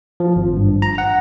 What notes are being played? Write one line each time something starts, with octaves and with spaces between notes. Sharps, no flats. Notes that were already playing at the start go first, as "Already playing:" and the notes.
F3
G#1
G2
A#5
F#5